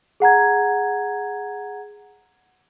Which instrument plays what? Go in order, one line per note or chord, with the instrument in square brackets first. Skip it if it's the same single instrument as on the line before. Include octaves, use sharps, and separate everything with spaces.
[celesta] G#4 F#5 A#5 G#6